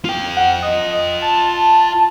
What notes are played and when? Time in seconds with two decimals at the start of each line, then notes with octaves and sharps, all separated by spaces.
0.05 F4 G5
0.37 F#5
0.62 D#5
1.22 A5